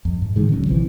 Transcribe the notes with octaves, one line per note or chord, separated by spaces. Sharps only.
F2
G#2
A2 D3 D#3 G#3
D1 D3 F#3 C#4
A#1 C3 E3